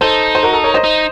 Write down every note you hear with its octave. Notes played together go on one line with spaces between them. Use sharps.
D#4 A4 C5
C5
F#4 A#4
A4
A#4 C#5
C5 D#5
D#4